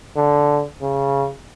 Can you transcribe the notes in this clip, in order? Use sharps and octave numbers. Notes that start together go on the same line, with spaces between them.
D3
C#3